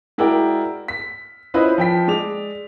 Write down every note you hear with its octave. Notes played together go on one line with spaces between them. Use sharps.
G#3 E4 F#4 A#4 D5 G5
B6
C#4 E4 F4 B4 C5 D#5
F3 G5 B6
G#3 D5 F7